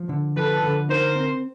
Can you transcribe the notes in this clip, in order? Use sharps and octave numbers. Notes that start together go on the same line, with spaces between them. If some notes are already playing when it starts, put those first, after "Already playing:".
Already playing: F3
D3
F3 A4 B4
D3
D#4 A#4 C5
C4